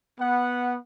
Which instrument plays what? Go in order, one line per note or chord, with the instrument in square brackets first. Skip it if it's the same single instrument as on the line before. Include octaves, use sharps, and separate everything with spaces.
[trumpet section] B3 F#5